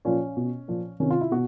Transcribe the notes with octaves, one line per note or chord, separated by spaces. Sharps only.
A#2 F3 C#4
B2
A#2 F3
C3 D#3 C#4
F4
E4
B2 F#4